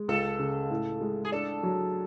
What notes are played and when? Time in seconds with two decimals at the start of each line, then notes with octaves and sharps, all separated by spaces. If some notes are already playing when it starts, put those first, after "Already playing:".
Already playing: G#3
0.08 C#2 A4
0.39 C#3
0.70 A2
1.01 G#3
1.25 G#4
1.32 D4 A4
1.63 F#3